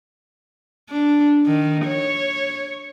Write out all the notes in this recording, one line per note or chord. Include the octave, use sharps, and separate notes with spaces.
D4
D#3
C#5